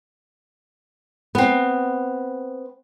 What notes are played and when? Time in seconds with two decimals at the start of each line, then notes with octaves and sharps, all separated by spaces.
1.35 B3 C4